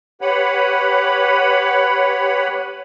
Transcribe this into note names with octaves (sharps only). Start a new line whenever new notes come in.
G4 B4 C#5 F#5 B5